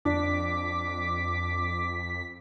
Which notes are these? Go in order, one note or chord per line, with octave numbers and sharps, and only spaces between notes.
F2 D4 D6 B6